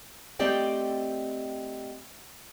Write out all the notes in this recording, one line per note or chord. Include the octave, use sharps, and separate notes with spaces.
A3 C4 G4 D5 D#5 G5